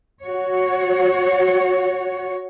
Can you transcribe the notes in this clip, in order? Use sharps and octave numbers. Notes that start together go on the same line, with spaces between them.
F#4 C#5